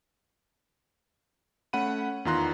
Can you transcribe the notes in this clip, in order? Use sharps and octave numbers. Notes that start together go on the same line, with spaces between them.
A3 C#4 F#5 B5 D#7
E2 D#3 F4 A#5 C6 F#6